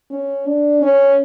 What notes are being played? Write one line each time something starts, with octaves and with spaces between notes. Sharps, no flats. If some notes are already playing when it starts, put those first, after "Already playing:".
C#4
D4
C#4